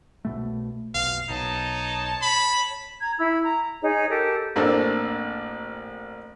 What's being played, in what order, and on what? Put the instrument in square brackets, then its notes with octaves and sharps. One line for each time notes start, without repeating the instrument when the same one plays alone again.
[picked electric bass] C2 B2 A3
[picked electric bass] F1 B1 [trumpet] F5
[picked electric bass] B1 [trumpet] D#4 [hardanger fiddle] C#5 A5
[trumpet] B5
[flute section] A#5 G#6
E4 B5 E6
A#5
D#4 G#4 C#5
G4 A4 A#4
[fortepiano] A1 A#3 C4 D4 A4